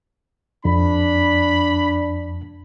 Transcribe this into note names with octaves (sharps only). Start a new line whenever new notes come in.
F2 D4 B5